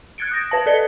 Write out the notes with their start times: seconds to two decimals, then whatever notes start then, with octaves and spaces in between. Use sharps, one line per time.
0.18 F#6 G#6 A6 C#7 D7
0.31 D#6 G6 A#6 D7
0.50 B4 A5 A#6
0.66 A4 D5 C#7 G7